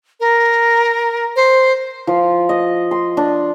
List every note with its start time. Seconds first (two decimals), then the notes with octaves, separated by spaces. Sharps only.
0.20 A#4
1.36 C5
2.07 F3
2.49 D#5
2.91 C6
3.17 D4